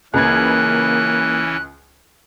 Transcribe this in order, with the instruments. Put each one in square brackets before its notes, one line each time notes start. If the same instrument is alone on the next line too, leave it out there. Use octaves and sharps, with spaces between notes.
[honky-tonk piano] C#2 B4 G#6 [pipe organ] E3 C#4 [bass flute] A#3 [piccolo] F#6